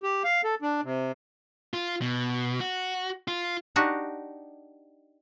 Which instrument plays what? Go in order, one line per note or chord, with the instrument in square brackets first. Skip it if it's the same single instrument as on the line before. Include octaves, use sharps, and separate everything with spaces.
[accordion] G4
F5
A4
D4
C3
[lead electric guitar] F4
B2
F#4
F4
[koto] D4 D#4 F#4 G4